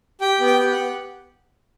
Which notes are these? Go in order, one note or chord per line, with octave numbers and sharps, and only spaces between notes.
G4 G5
B3
G5
G4
F#5
B3